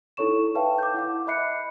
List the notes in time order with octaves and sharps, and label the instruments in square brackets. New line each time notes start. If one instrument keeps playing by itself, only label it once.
[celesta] D#4 E4 A4 C#5 C#6 E7
B4 C#5 E5 F5 G5 A5
D6 G6
E4 F#5 D6
D#5 E5 B5 F#6 C7 C#7